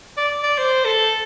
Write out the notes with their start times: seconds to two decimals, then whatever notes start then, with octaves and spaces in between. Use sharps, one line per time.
0.17 D5
0.43 D5
0.58 C5
0.85 A4